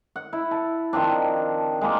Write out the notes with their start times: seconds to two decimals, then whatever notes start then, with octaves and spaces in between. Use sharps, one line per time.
0.16 F#5
0.33 E4
0.51 A5
0.93 D#3 F3 C4 D4
1.81 G#3 A#3 F4